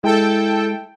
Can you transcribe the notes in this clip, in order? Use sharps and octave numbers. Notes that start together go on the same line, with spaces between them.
G#3 E4 A4 G5